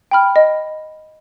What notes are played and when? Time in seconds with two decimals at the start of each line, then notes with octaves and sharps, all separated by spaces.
0.11 G5 B5 F6
0.36 D#5